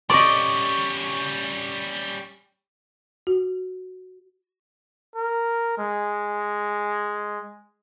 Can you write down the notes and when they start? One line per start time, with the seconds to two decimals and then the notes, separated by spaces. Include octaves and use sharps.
0.10 G3 C#4 D5 D#5 C#6
3.27 F#4
5.16 A#4
5.78 G#3